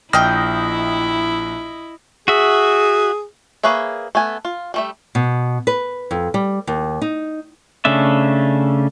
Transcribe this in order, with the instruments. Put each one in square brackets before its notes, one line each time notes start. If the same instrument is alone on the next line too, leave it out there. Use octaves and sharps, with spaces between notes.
[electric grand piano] A#1 [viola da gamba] E4 [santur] D#5 [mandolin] G5 F6
[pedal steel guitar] F#4 E5 [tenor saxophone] G#4
[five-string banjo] A#3 G#4 B4 C#5 E5
A3 B3 G#5
F4
G3 A3 E5
[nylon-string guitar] B2
B4
F2
G3
D#2
D#4
[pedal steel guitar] C#3 A3 C#4 D4 E5